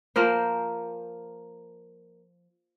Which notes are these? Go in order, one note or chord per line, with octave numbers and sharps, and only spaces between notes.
F3 A#3 A#4 C5